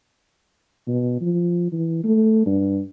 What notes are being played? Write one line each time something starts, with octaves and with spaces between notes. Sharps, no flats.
B2
F3
E3
A3
G2